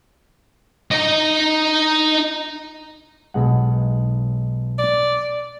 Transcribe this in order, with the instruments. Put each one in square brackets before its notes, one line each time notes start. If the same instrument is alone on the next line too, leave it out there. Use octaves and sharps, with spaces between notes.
[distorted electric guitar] D#4 D#5
[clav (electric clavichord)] B1 G#3 F#5
[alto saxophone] D5